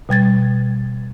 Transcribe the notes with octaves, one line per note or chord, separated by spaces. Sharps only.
B2 G3 G#6 A6